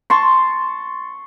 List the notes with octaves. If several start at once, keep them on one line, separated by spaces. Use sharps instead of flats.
A5 C6 C#6